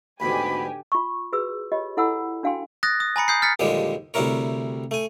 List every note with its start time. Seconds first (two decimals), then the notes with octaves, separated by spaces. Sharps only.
0.20 D2 G#2 B2 D3 G4 G#5 B5
0.92 F4 C#6
1.33 F#4 G#4 B4 E6
1.72 F4 G4 C#5 D#5
1.97 E4 A4 F#5 G#5 B5 E6
2.43 D4 F#4 F5 G5 G#5 C6
2.83 D#6 F#6 A6 A#6
3.00 D#6
3.16 G#5 A#5 B5 C#7
3.28 D#6 G6 C7
3.42 F6 A6 B6 C#7
3.60 A#1 D#2 D3 F3 G3 G#3
4.14 D2 C3 G3 E4 A#4 C#5
4.91 A3 G#5